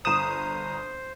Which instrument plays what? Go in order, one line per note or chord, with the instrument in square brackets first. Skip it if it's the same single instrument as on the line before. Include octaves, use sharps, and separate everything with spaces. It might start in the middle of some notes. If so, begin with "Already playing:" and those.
[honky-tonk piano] G1 E7 [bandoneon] C5 [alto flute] A#5 [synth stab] D#6